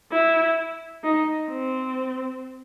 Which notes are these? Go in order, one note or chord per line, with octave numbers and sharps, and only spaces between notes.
E4
D#4
C4